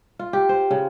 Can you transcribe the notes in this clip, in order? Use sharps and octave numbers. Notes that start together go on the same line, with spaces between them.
F4
G4
C5
C#3